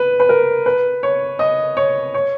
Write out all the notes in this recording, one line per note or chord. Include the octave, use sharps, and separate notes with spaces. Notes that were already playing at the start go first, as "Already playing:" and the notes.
Already playing: B4
B4
A#4
B4
C#5
D#5
C#5
C#5